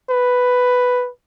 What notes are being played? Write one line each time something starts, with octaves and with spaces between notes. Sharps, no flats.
B4